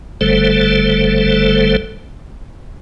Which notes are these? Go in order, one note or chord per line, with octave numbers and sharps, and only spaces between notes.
F#1 D3 G3 A3 A4 C5